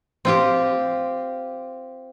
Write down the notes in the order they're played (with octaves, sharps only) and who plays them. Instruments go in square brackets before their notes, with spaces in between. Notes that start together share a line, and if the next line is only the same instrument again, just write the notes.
[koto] C4 F4 G4